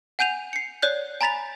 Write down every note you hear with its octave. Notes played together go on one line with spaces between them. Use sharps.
F#5 G#5 G6 D#7 F7
C7 C#7
C#5 D5 F#6 G6
G#5 A#5 B5 A6 B6 F7